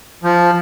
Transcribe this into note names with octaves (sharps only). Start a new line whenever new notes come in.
F3